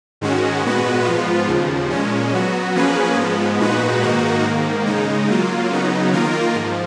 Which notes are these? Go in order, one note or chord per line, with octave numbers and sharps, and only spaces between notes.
G#2 D#3 G#3 C#4 F#4
A#2 G#3 B3 F#4 B4
G#2 F3 B3 F4
D#2 C#3 F3
A#2 G#3 C#4
F#3 B3 F#4
F3 A#3 C#4 G#4 B4
G#2 F3 G#3 B3
A#2 G#3 D#4 F#4 B4
G#2 D#3 A#3 D#4 F#4
G#2 D#3 A#3
C#3 G#3 D#4
F#3 A#3 F4
C#3 F#3 B3 D#4
D#3 A#3 F4 A#4
G#2 F3